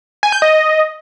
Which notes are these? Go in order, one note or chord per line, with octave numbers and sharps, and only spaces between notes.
G#5
G6
D#5